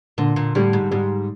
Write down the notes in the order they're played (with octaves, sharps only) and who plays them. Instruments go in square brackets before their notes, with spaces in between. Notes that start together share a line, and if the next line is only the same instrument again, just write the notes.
[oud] A#2 [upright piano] D3
[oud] A#2
[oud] A2 [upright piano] G3
[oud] G#2
[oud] G#2 [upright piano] G3